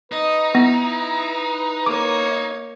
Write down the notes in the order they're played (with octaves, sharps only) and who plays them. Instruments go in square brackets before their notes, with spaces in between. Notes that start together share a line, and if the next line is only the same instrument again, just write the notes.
[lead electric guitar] D#4 [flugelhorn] B4 [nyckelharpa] D#5
[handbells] B3 A#6 [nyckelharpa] E4
[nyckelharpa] A#3 C#5 [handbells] D6